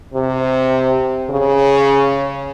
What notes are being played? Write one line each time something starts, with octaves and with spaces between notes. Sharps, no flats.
C3
C#3